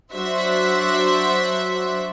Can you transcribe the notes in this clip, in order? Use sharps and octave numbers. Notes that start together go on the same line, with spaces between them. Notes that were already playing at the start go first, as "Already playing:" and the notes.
F#3 D4 F#4 C5 E5